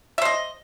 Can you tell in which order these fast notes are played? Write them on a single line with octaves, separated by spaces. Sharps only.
E5 C5 D#5